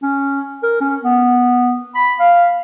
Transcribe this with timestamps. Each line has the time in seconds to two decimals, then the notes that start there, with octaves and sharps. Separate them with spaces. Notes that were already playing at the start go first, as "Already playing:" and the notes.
0.02 C#4
0.63 A#4
0.81 C#4
1.04 B3
1.95 B5
2.20 F5